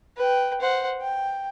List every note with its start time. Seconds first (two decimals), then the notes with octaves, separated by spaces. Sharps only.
0.17 B4 G5
0.61 C5 F#5
1.01 G5